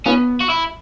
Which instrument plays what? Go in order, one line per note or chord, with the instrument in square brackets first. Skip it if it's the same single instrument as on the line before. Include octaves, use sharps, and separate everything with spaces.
[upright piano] B3 [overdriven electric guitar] C#4
[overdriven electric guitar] F#4
E4